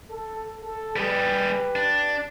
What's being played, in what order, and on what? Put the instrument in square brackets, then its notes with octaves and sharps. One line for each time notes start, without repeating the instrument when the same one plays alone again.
[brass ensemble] A4
A4
[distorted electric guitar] G3 G#4 [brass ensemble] G4 B4
[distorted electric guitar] D4